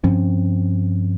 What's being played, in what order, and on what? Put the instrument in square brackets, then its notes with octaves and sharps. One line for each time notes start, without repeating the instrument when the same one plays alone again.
[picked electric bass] G2 F3 C4 C#4